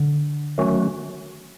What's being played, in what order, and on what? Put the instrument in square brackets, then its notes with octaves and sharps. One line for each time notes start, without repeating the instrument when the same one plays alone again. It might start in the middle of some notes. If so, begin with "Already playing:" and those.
Already playing: [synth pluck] D3
[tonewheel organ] D#3 F#3 A3 C#4 F#4